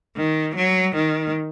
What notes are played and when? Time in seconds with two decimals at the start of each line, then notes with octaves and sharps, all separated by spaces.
0.17 D#3
0.56 F#3
0.96 D#3